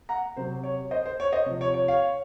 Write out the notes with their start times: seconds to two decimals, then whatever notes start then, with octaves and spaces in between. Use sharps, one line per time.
0.09 F#5 A#5
0.37 C3 F#3 C5
0.64 C#5
0.91 C5 D#5
1.06 C5
1.20 C#5
1.32 C5 D#5
1.46 C3 F3
1.61 C#5
1.74 C#5
1.88 C#5 F5